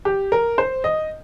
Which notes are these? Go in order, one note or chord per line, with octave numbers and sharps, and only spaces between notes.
G4
A#4
C5
D#5